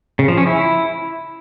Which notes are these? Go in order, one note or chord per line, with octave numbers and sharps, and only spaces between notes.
C#3
F3
C#4
E4